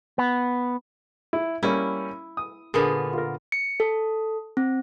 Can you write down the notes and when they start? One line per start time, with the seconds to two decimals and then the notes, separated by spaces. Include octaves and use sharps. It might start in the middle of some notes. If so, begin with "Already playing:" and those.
0.18 B3
1.33 E4
1.63 G3 A#3 C#4 E4
2.37 D#6
2.74 A#2 D3 B3 G#4
3.14 F4 A#4
3.52 C#7
3.80 A4
4.57 C4